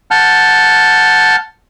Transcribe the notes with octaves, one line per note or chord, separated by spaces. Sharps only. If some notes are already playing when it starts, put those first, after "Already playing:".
F#5 A5 F6 G6